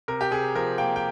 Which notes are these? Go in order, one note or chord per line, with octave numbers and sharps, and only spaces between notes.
C3 A#4
G4
C3 G#4
F3 A#4
A#3 G5
G5